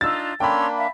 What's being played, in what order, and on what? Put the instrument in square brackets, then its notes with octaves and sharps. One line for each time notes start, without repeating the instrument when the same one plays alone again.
[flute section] D4 D#4 F4 [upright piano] E6 A6
[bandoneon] A#3 D4 [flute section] C#4 C6 E6 [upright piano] G5 B5
[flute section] E5 F5